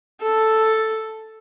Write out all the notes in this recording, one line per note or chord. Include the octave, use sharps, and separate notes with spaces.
A4